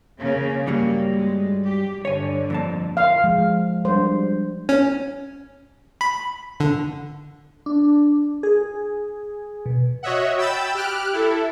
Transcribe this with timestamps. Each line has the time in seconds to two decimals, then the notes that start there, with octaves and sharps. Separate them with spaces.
0.20 C#3 A#3 C#4
0.67 G2 F#3 G3 A#3
1.13 G#3
1.65 G4
2.05 G2 D3 C#5 G#5
2.50 F2 A#2 A5
2.97 F5
3.24 F3 G#3
3.85 G3 D4 C5
4.69 C#4
6.01 B5
6.60 D3
7.66 D4
8.43 G#4
9.66 B2
10.03 F#4 C#5 D#5 E5 F#5
10.38 G5 B5 E6 G6 A6 E7
10.74 G4 F6 F#6 D7
11.13 E4 A4